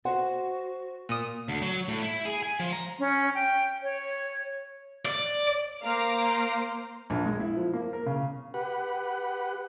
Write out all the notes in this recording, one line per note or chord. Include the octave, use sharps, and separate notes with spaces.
F#4 C5 F#5
A#2 D#6
D2
F#3
A2
E4
G#4
G#5
F3
A#5
C#4
G5
C#5
D5
A#3 C5 F5 A#5 D6
A#1
G#3
E4
F3
A#3
A#4
C#3
G4 B4 F#5